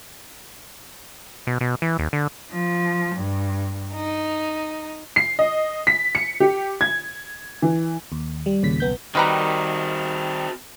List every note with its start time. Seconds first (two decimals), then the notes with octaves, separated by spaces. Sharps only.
1.47 B2
1.61 B2
1.82 E3
1.99 D#2
2.13 D3
2.51 F3
3.16 G2
3.96 D#4
5.16 C7
5.39 D#5
5.87 B6
6.15 C#7
6.40 G4
6.81 G#6
7.62 E3
8.12 D#2
8.46 G3
8.63 D#2 A#2 C#3 B6
8.80 B1 B3 G6
9.15 D#3 G3 C4 F#4 A#4 B4 A#5